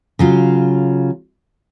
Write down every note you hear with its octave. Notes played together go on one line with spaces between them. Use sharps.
C#3 F#3 F4